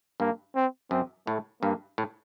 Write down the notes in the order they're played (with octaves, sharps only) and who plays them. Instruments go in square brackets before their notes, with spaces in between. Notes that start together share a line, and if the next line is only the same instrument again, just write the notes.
[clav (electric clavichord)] G2 [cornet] A#3
[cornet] C4
[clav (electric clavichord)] F#2 [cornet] C4
[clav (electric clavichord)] A2 [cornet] A3
[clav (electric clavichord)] G2 [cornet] A#3
[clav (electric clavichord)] A2